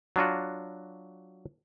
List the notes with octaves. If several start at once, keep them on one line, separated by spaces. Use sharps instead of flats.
F#3 D4 F4 F#4